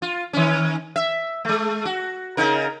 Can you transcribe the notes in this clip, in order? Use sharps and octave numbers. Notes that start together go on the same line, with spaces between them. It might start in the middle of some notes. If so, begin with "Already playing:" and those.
F4
D#3 C#4
E5
G#3 A3
F#4
C#3 D#4 A#4